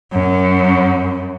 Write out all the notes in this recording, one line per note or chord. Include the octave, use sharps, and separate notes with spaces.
F#2